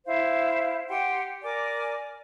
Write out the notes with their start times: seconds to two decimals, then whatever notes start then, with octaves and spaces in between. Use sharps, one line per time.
0.06 E4 C5 F5
0.88 G4 F#5 G5 C6
1.43 A#4 D5 G#5 D6